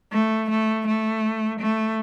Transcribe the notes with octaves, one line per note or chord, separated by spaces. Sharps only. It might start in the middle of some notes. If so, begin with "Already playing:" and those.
A3
A3
A3
A3